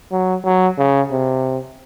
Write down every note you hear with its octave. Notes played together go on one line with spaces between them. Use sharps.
F#3
F#3
C#3
C3